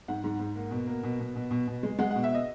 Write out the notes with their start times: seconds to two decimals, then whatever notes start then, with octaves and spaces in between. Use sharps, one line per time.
0.08 G#2 F#5
0.24 G#2
0.39 G#2
0.55 A#3
0.71 B2
0.87 A#3
1.03 B2
1.20 B2
1.36 B2
1.51 B2
1.67 B2
1.83 G#3
1.99 G#3 F#5
2.11 B2 F#5
2.23 E5
2.35 D#5